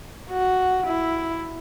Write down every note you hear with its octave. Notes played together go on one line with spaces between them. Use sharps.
F#4
E4